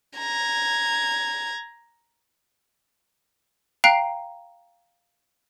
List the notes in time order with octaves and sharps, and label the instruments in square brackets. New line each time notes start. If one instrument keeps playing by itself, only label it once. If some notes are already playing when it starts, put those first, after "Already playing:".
[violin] A#5 G#6
[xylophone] F5 G5 A#5 F#6 C7 D7